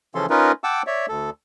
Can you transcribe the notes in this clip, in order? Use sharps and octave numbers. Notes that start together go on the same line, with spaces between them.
C#3 E3 F3 C#4 A4 C6
C#4 D#4 F4 A#4 B4
F#5 G5 A5 D6 E6
C#5 D5 E5
D2 A4